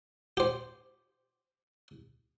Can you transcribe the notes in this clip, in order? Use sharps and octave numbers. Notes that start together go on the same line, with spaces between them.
G4 C5